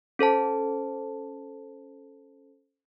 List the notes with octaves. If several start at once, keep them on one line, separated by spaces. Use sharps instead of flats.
C#4 A4 C5 A5